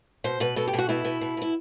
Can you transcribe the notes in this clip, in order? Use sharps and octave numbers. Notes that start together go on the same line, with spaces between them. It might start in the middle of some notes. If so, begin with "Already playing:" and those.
B2 C5
B2 B4
B2 A4
G4
B2
F#4
B2 E4
B2
B2
B2 E4